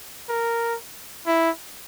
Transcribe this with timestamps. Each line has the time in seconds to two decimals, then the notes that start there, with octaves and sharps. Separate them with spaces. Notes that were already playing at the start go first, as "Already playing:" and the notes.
0.29 A#4
1.27 E4